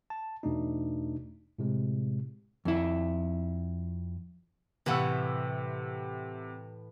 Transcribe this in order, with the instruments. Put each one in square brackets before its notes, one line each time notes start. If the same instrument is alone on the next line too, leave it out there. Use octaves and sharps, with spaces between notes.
[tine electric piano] A5
E2 B2 A3 D4 D#4
A2 C3 G#3
[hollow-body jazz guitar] F2 E4
[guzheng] A2 E3 [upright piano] C3 F#5 E6